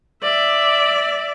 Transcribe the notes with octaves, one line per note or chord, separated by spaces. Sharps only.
D5 E5